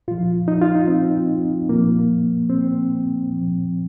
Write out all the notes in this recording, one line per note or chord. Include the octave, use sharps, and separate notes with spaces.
A#2 F3 F4
D#4
F4
D#4
C4
A#2 F3 A#3
C4
A#2 F3